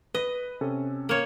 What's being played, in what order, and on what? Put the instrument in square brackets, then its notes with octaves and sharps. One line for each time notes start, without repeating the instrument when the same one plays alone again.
[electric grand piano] B4 D#7 [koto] D#5
[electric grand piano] C3 C#4 A4
[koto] A#3 C#5